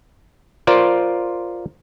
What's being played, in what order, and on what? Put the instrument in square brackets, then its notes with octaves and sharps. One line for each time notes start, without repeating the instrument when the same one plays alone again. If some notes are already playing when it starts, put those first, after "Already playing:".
[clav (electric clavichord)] F4 A#4 C5 D5